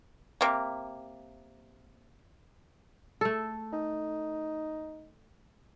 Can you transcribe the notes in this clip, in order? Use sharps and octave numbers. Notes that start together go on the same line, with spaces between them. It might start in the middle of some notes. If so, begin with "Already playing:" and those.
C3 A#3
A3 A4
D#4